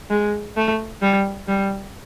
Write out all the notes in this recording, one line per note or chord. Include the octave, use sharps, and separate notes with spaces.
G#3
A3
G3
G3